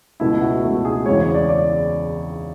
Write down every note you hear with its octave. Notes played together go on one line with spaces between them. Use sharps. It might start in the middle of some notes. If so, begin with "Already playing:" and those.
C#2 B2 A3 E4
F#4
C#2 B2 A3
G#4
E2 C#3 G#3 C#5
C#5
D5
D5